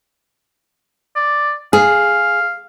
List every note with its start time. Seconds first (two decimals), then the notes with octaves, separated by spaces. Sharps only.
1.16 D5
1.73 G#4 F5